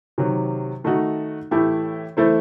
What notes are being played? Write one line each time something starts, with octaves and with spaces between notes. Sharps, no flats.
C3 D#3 F#3
D#3 A3 D#4 F#4
A2 E3 A3 E4 G4
E3 A3 E4 A4 C5